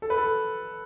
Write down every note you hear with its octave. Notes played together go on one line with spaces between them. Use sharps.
A4
B4
A4